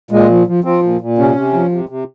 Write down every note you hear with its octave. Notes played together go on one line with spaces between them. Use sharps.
A#2 G#3
F3
F3
F3 C4
A#2
A#2
C3 C#4
C3
F3
C3
C3